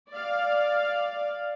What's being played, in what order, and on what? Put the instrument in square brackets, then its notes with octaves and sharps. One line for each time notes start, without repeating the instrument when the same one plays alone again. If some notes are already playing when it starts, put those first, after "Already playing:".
[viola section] D5 F5